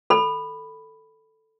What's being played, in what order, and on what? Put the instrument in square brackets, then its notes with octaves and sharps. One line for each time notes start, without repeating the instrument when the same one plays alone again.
[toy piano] A4 B5